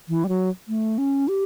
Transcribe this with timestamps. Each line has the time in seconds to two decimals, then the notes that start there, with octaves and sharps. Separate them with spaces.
0.08 E3
0.24 G3
0.29 F#3
0.68 A3
0.98 C#4
1.28 G4